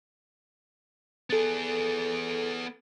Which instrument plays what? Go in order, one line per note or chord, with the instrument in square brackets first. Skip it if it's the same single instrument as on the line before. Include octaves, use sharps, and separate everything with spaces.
[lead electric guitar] B3 G#4 [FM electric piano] A4 A6